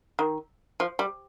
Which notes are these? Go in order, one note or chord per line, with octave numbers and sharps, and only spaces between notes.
D#3
F3
G3